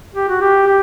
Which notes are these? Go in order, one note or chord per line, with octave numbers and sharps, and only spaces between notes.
G4
F#4
G4
G4